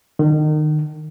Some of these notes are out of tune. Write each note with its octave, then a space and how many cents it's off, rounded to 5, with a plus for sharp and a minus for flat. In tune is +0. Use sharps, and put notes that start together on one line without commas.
D#3 -30